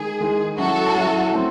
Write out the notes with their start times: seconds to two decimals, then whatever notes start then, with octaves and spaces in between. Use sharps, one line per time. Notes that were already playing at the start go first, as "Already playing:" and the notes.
Already playing: D#3 G#3 D#4 G#4
0.21 D#3 G#3 D#4
0.57 F#3 C#4 E4 F#4 A4
0.95 F#3 C#4 E4
1.32 F#3 A3 C4